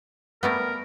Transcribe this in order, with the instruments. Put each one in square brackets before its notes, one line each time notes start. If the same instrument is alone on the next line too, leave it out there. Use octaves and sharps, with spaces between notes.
[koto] G3 A3 B3 [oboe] A#4